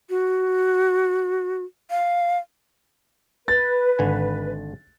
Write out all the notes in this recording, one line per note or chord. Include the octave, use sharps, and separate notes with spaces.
F#4
F5
B4 A6
G#1 D3 G#5